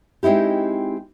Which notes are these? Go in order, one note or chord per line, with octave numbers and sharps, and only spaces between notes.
G#3 C4 D#4 E4 G4